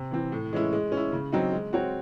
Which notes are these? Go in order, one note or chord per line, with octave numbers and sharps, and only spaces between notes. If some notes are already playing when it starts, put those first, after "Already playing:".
Already playing: C3
E3 C4
A2
E3 G#3 C#4 E4
G#3
C#4
E4
C#3
F#3 C4 D#4
G#3
C4 F#4 C#5